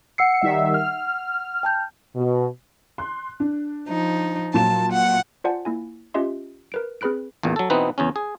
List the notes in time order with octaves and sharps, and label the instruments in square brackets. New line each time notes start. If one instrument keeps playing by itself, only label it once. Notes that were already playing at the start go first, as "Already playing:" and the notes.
[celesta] F#5 E6 C7 [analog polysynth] C#7
[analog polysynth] D#3 G3 E5
F6
[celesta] G5 A5 G6
[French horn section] B2
[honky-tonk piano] C6 F#6
D4
[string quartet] F3 D#4
[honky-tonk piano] A#2 F#3 E7 [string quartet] A5
[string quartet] F#5
[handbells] F4 C5 D5 F#5 G#5 A5
A#3 E4 G#5
C#4 F4 G4 D#5 E5 C6
A#4 B4 D7
C4 G#4 B4 B5 F#6 D7
[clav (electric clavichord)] A1 E2 A#2
F#3 A4
B2 E3 B3 C4 D#4 B4
E2 C#3 C#4
G#4